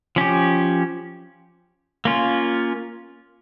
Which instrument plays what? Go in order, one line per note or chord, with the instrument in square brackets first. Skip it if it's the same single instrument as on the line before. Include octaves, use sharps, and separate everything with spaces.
[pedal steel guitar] F3 C#4 G4
A#3 C#4 F4